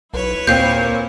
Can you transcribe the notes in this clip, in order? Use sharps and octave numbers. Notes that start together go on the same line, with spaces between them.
B1 E4 B4 C#5
D#2 A#2 A#3 C4 G6 C7